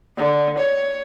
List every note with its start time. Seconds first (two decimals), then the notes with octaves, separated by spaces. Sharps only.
0.17 D3
0.58 C#5